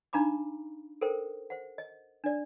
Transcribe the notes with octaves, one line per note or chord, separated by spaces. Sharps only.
D4 D#4 F5 A#5 B5 D6
A4 A#4 C5 G5
C5 F#5
D#5
D4 D5